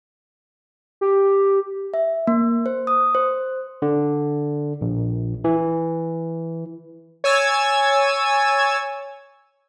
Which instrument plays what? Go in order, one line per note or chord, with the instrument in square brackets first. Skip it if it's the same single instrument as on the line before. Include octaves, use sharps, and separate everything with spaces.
[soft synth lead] G4
[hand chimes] E5
A#3
C5
D#6
C5
[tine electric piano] D3
A#1
E3
[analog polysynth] C#5 G#5 E6 G#6 A6